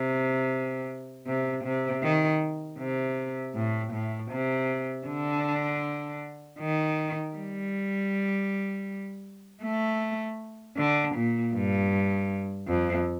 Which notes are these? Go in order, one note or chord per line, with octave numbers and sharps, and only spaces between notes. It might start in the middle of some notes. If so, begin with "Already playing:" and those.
Already playing: C3
C3
C3
D#3
C3
A2
A2
C3
D3
D#3
G3
A3
D3
A#2
G2
F2